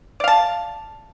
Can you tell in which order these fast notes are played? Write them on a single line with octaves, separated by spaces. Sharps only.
D5 F5 A5